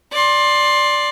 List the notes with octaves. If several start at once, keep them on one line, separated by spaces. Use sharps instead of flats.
D5 C6